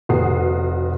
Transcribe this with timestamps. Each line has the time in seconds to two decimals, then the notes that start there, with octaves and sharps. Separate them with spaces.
0.09 F1 F#4 B4 D#6 C7